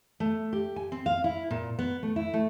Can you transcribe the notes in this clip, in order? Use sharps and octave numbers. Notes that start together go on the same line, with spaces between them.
A3
G4
G#5
C4
F5
E4
A#2
B3
A3
E4
A3